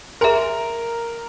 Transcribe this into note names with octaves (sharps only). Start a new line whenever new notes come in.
G#4 A#4 E5 G#5 C6